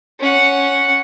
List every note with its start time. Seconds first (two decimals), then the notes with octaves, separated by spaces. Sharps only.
0.20 C#4 F#5